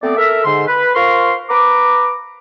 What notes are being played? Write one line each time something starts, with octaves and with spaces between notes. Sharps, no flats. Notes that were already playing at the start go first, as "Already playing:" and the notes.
A3 B3 C4 D5
A4 A#4 E5
G#2 D3 C6
B4
F4 A#4 C5 C6 C#6
B4 A#5 D6